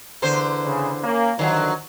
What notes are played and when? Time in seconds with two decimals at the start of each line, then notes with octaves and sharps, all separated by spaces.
0.22 E2 D3 C5
0.66 C#3
1.03 A#3 C#4
1.39 D3 D#3 F3 F#3